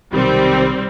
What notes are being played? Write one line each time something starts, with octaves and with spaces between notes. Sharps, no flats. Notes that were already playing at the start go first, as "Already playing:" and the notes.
B1 C3 D#3 G3 C4